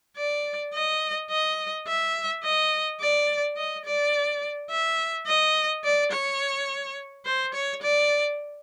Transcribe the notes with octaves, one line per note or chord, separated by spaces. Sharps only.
D5
D#5
D#5
E5
D#5
D5
D#5
D5
E5
D#5
D5
C#5
C5
C#5
D5